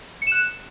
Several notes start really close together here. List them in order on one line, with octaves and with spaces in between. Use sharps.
C#7 E7 F#6